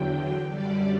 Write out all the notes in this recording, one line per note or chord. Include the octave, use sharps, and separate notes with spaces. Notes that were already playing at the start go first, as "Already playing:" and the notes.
Already playing: E2 D3 F#3 G5
F#2 D3 G3 D5